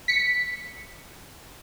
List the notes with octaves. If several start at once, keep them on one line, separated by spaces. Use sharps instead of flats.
B6 C#7